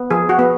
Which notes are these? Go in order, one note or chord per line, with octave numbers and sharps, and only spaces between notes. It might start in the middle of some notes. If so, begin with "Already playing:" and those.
Already playing: B3
F3 G#4
F#4
B3